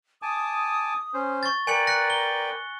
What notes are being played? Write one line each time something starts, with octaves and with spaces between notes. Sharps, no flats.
G#5 A5 D6 D#6
C#4 C5
C#6 A6
A#4 B4 D5 G5 G#5 C#7 F#7
F#6 A#6 C#7
G7